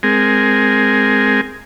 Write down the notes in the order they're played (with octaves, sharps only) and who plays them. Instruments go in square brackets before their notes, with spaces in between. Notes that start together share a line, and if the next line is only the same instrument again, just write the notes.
[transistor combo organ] G#3 C4 G#4 A#4